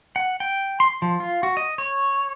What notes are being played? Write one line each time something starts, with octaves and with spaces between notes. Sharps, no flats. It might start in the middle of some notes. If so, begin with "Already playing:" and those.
F#5
G5
C6
F3
F4
F#4
D#5
C#5